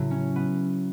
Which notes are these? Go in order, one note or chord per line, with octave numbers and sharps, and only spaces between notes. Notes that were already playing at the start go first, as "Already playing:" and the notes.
Already playing: A2 C#3 F#3 E4 F#4
C#4
B3